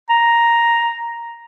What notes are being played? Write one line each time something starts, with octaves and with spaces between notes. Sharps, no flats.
A#5